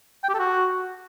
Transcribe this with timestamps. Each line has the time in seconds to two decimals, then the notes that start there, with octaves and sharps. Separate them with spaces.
0.24 G5
0.29 G4
0.34 A4
0.39 F#4